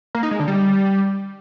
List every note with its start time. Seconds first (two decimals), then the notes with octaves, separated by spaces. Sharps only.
0.15 A#3
0.23 D#4
0.31 G#3
0.39 D3
0.48 G3